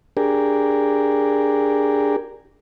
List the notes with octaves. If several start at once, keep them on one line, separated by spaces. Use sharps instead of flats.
D4 G4 G#4 A#4